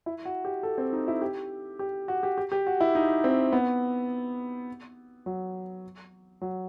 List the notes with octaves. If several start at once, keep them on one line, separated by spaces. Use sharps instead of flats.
E4
F#4
G4
A4
C4
D#4
E4
G4
G4
F#4
G4
G4
G4
F#4
E4
D#4
C4
B3
F#3
F#3